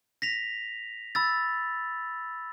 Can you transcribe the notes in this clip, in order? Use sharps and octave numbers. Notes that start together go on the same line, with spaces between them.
A#6 B6 F7
B5 E6 A6